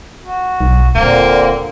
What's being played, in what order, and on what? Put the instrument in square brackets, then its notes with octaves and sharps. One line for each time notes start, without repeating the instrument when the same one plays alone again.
[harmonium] F#4
[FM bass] B1
[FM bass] D#1 [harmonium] A#2 D3 C4 [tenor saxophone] A#3